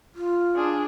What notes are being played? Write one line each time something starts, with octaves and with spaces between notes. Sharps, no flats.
F4
D4 G#4